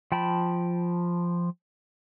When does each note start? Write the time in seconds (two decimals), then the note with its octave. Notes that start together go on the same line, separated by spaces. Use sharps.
0.12 F3 G5 A5 B5